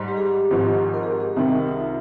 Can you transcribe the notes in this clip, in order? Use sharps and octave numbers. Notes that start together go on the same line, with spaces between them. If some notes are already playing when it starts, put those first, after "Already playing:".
Already playing: G#2 G3
G4
G#4
G4
G#1 G#2 F3
A#4
G#4
G4
G#4
C2 C3 D#3
D#4
F4